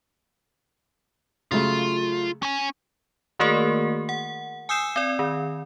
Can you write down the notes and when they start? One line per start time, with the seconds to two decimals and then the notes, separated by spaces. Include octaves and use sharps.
1.51 C#3 F#3 A3 F4
2.43 C#4 G#5
3.39 D#3 A3 A#3 F#4 G#4 A#4
4.09 F#5
4.69 G#5 D#6 E6 G6 C7 E7
4.96 C4 D5
5.19 D#3